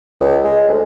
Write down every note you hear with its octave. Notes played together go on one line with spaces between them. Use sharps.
C#2
G#3
D2